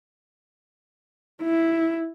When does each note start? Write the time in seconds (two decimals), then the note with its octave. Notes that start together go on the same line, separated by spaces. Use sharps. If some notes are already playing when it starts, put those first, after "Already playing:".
1.43 E4